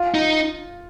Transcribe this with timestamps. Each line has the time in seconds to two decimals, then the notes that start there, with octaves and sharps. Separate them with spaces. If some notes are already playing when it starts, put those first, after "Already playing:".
Already playing: F4
0.14 D#4